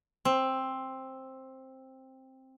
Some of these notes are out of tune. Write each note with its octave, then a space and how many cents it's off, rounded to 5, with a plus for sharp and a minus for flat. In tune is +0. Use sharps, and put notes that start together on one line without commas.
C4 +10